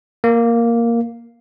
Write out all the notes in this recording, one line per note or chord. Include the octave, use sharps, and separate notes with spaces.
A#3